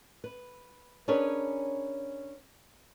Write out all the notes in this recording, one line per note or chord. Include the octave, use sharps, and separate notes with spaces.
B4
C#4 D4 G#4 A#4 B4 C#5